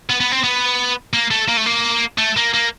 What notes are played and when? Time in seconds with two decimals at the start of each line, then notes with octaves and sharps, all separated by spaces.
0.10 B3
0.20 B3
0.32 C4
0.44 B3
1.13 A#3
1.31 A3
1.49 A#3
1.57 A3
1.66 A#3
2.18 A3
2.37 A#3
2.54 A#3